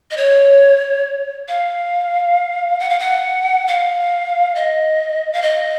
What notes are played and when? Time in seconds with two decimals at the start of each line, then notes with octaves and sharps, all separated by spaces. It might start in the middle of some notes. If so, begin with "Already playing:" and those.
0.11 D#5
0.17 C#5
1.48 F5
2.80 F#5
2.90 F5
2.99 F#5
3.68 F5
4.55 D#5
5.33 F5
5.42 D#5